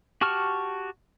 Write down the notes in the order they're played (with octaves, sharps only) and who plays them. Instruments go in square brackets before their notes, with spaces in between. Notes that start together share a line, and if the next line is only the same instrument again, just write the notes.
[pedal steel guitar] F#4 G4 A5 C#6 F6